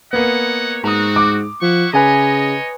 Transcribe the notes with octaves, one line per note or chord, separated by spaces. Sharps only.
A#3 B3 C#5 D#5 F#5
G#2 C4 F#4 A#5 D#6
D6
F3 E4 F#5 C#6
C#3 B4 C#5 D#5 G#5 A#5